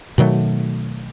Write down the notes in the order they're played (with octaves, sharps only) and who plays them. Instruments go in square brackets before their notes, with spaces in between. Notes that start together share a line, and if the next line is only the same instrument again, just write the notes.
[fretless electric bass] B2 D#3 F#3 A3